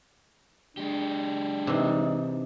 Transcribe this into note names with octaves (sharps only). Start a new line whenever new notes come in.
G#3 D4 G4
C3 E3 D#4